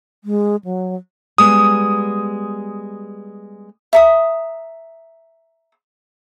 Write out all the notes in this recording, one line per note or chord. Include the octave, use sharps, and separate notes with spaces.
G#3
F#3
G3 G#3 B3 D#6
E5 A#5 D#6